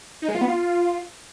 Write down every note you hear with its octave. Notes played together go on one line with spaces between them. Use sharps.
D#4
G#3
F4
B3
F4